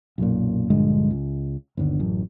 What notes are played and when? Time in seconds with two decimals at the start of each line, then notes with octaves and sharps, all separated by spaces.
0.18 B1 F#2 A#2
0.70 A#1 G2 D3 G#3
1.11 C#2
1.77 G1 D#2 D3
2.00 A1 F#2